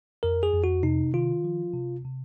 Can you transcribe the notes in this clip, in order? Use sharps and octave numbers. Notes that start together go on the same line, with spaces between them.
F2 A#4
G#4
F2
F#4
C3 D#4
D#3 F4
F3
C3
C3